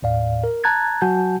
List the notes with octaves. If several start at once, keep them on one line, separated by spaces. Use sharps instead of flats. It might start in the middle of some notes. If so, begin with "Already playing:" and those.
D#2 A2 D5 F5
A#4
A5 A#5 F#6 G#6 A6
F#3 F#4 F#5 G#5 A5 G6